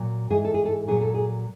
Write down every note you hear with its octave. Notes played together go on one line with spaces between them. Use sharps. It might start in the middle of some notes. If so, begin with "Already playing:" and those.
Already playing: A#2 F#3
G#2 E3 G#4
A4
G#4
A4
A#2 F#3 G#4
A4
G#4